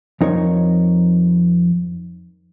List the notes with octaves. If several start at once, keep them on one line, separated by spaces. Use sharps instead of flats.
F2 D#4 A#4 C#5